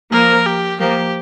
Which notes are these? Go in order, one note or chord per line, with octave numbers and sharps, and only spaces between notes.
F3 A#3 A#4
G4
F3 A#3 G4